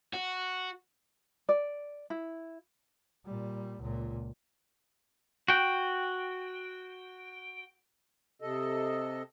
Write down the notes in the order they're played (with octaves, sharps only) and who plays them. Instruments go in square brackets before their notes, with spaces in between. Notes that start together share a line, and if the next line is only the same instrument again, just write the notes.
[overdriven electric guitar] F#4
[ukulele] D5
E4
[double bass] A#2 G3
C#2 A#2
[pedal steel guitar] F#4 G5
[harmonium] C3 A4 D#5